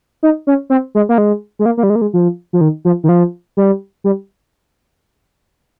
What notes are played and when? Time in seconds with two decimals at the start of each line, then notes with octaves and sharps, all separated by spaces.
0.23 D#4
0.47 C#4
0.70 C4
0.95 G#3
1.09 A#3
1.18 G#3
1.59 G#3
1.66 A#3
1.77 A#3
1.83 G3
1.90 G#3
1.96 A#3
2.02 G#3
2.13 F3
2.53 F3
2.61 D#3
2.85 F3
3.04 D#3
3.09 F3
3.57 G3
4.04 G3